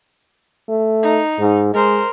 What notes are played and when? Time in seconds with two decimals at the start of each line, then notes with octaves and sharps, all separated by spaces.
0.69 A3
1.03 D#4
1.39 G#2
1.74 G#3 A#4 C5